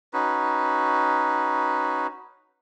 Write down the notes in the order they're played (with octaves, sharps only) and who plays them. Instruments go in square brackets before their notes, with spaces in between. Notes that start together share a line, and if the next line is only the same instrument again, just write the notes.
[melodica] C#4 D#4 F#4 B4